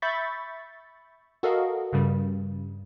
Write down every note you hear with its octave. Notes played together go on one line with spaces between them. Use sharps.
E5 B5 C#6 G6 A6 B6
F#4 A4 A#4 D#5 F5
G2 C#3 G3